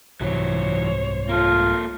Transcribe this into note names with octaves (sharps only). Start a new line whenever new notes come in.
C2 G#2 C3 E3 F#3 C5 C#5
A#3 F4 A4